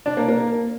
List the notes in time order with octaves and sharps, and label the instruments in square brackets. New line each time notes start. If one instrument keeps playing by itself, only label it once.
[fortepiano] D4
A#3
A#3